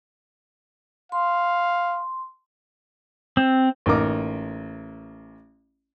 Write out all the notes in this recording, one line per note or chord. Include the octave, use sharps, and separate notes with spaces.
F5 C6
C4
A1 A#3 D#4 A#4 D6